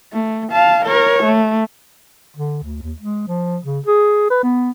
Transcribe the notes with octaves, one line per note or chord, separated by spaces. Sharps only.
A3
F5 A5
A#4 C#5
A3
D3
D2
D#2
G#3
F3
C#3
G#4
B4
B3